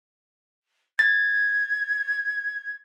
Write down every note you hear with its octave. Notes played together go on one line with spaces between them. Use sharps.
G#6 A6